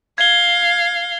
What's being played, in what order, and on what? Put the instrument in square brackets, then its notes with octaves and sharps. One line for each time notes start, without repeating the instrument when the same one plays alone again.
[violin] F5 [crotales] G#6 G7